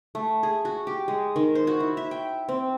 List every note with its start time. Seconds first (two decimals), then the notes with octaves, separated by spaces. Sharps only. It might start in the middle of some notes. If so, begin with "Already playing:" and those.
0.15 A3
0.43 G#4
0.65 F#4
0.87 G4
1.08 G#3
1.36 D#3
1.55 C5
1.67 F#4
1.80 E4
1.97 E5
2.11 G5
2.49 C4